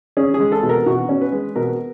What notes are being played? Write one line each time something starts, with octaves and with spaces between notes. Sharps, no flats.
C#4 G#4
G#4
G#3
A4
B2
A#4
B2 F#4
C#4
B4
G#3
B2 A#4